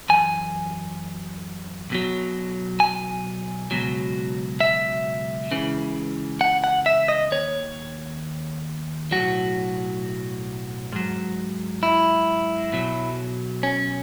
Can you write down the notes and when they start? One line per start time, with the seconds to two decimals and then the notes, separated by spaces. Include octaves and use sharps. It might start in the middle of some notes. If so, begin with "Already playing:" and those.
0.09 F#2 E3 G#5
1.90 B1 B2 F#3
2.80 G#5
3.71 C#2 B2 F#3
4.60 E5
5.51 C#2 C#3 E3
6.41 F#5
6.64 F#5
6.86 E5
7.08 D#5
7.31 D#2 D#3 C#5
9.11 B1 A2 F#3 F#4
10.93 G#2 F#3
11.83 E4
12.72 B1 B2 F#3
13.63 C#4